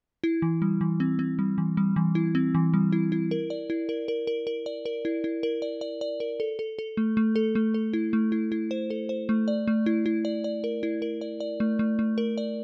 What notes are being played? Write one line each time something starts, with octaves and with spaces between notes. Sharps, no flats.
E4
E3
G3
E3
C4
C4
G3
E3
G3
E3
E4
C4
E3
G3
E4
E4
A#4
D5
E4
A#4
A#4
A#4
A#4
D5
A#4
E4
E4
A#4
D5
D5
D5
A#4
A4
A4
A4
A3
A3
A4
A3
A4
E4
A3
E4
E4
C5
A4
C5
A3
D5
A3
E4
E4
D5
D5
A#4
E4
A#4
D5
D5
A3
A3
A3
A#4
D5